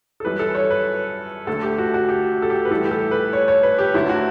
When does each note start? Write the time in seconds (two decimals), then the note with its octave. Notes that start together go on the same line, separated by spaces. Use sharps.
0.20 A4
0.24 F#2 E3 G3 B4
0.39 A4
0.55 C#5
0.71 B4
1.47 D2 D3 A3 A4
1.63 G4
1.78 F#4
1.94 F#4
2.09 G4
2.42 A4
2.50 G4
2.65 B4
2.70 A2 E3 G3 A4
2.85 G4
2.91 A4
3.11 B4
3.33 C#5
3.48 C#5
3.63 B4
3.79 G4
3.94 D2 D3 F#3 A3 E4
4.09 F#4